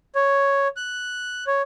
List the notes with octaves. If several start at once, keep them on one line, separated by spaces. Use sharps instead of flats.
C#5
F#6
C#5